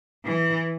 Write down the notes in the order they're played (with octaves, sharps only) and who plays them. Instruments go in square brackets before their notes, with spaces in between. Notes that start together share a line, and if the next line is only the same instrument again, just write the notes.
[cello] E3